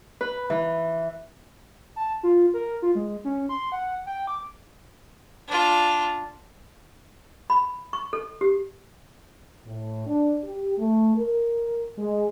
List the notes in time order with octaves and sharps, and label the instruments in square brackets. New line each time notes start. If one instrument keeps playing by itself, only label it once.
[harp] B4
E3
[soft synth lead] A5
F4
A#4
F4
G#3
C#4
C6
F#5
G5
D6
[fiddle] D4 F4
[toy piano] B5
C#6
A4
G4
[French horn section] A2
D4
G4
A3
A#4
G#3